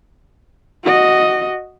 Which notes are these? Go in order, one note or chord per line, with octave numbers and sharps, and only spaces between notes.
F#4 D#5